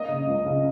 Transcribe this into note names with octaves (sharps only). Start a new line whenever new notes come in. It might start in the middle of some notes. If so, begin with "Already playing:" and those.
Already playing: A#3 D#5
C#3
C#2
C#3